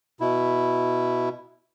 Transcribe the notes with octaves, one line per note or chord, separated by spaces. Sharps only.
B2 E4